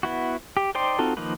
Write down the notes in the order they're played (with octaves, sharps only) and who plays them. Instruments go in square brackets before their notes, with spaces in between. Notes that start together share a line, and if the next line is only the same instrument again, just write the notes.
[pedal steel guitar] B3 E4 F#4
G4
D#4 C5 D5 G5 C6
C4 D#4 F4 F#4 A4
D#3 F3 A#3 D#4 B4